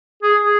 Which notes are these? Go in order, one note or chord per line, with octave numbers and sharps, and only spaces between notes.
G#4
G#4